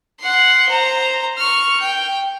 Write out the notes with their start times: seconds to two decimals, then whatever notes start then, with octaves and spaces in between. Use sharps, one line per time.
0.20 F#5 C6
0.68 C5 A#5
1.38 C#6 F6
1.80 G5